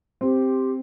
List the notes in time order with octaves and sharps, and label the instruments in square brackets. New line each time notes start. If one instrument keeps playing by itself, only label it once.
[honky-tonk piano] C4 [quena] G4